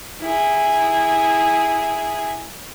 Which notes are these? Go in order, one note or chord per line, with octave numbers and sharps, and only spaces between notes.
E4 G#4